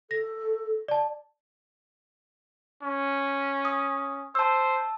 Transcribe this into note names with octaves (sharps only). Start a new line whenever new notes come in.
A4 A#6
D5 A5
C#4
D#6
C5 A5 E6